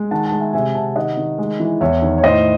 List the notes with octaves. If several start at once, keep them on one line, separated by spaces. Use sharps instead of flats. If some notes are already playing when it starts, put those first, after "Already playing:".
Already playing: G#3
D#3 F#5 A5
F#5 A5
G#3
E5 G#5
C3 E5 G#5
C3 F#5 A5
D#3 D#5 F#5
D#3
G#3
E3
E2 C#5 E5
D#3
C#5
A2 C5 D#5